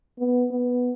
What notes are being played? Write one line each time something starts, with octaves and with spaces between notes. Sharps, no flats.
B3
B3